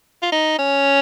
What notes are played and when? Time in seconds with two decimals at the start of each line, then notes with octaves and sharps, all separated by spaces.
0.22 F4
0.32 D#4
0.59 C#4